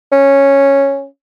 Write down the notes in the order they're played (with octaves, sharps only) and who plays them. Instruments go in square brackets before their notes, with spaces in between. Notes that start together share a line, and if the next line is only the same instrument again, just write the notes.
[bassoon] C#4